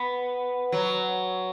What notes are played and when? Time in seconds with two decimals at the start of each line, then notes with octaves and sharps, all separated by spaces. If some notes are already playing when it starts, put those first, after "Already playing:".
Already playing: B3
0.72 F#3